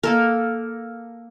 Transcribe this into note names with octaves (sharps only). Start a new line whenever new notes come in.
A#3 A4 A#4